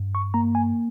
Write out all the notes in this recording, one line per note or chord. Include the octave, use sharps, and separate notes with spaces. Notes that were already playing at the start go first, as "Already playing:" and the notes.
Already playing: G2
C#6
A#3 A#5
G#5